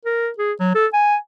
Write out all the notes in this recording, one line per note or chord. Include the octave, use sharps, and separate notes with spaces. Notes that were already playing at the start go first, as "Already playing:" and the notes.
A#4
G#4
F#3
A4
G#5